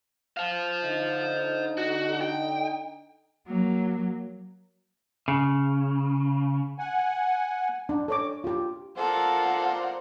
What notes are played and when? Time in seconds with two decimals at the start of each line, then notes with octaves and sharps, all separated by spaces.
0.37 C5 F5
0.83 D3 D#4
1.78 F#4
2.21 G5
3.47 F#3 A#3
5.28 C#3
6.79 F#5 G#5
7.89 D4
8.08 A4 C#5 D6
8.44 F4 G4
8.98 F4 A4 A#4 C5 D5 F#5